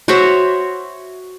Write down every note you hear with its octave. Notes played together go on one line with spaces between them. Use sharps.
F#4 C5 C#5 E5